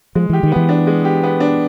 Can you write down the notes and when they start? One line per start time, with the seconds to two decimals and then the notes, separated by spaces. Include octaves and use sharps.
0.15 F3 G#3
0.30 E3 G4
0.43 D#3
0.52 E3 B3
0.69 D4
0.87 G#3
1.05 G4
1.23 B3
1.40 D4